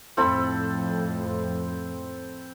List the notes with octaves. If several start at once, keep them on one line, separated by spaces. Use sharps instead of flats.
F2 A2 C4 A4 B5